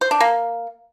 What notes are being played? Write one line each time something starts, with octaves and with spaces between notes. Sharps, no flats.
C5
D4
A#3